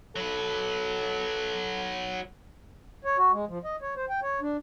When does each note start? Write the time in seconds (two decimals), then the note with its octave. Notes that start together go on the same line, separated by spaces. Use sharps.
0.16 F#3 A4 B4
3.05 C#5
3.18 F#4
3.32 G#3
3.48 F3
3.64 D#5
3.82 C#5
3.97 C5
4.09 G5
4.22 C#5
4.41 D4